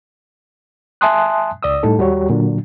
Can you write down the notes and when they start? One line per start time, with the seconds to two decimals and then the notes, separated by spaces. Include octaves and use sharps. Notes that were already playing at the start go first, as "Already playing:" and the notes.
1.01 E5 G#5 A5 C6 D#6 F#6
1.63 C#2 D5 D#6 E6
1.83 A2 G3 D#4 A4
1.98 D#2 G3 F#4 G4 C#5
2.30 A#2 D3 F#3 D4